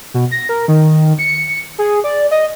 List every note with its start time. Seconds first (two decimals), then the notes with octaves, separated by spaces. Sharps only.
0.14 B2
0.31 A#6
0.49 A#4
0.68 D#3
1.19 C#7
1.78 G#4
2.04 D5
2.31 D#5